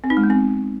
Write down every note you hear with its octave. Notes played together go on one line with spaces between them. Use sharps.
C4
D#4
G#3
B3
C4